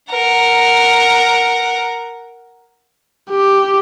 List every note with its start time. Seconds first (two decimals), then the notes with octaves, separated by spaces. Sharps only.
0.11 A#4 F#5
3.31 G4